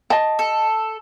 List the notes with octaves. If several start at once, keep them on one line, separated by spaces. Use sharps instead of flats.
D#5 A5
A4